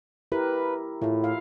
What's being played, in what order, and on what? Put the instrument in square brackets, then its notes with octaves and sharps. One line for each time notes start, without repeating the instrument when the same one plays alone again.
[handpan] E4 G4 A#4 [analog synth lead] B4
[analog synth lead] A2 [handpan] E4 F4
[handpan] F5